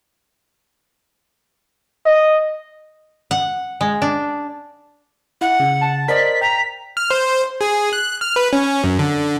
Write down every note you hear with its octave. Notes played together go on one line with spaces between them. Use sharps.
D#5
F#5
G#3
D4
E4 F#5
C#3
A5
A#4 C5 D5 D#5 B6
G5 A#5
F6
C5
G#4
F#6
F6
B4
C#4
F#2
D3